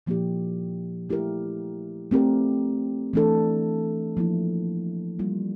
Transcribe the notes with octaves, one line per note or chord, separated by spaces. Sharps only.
A#2 F3 A#3 E4 G4
A3 E4 G4 A#4
A3 C4 G4 A#4
E3 A3 D4 A4
F3 A#3 E4
G3 A#3 F4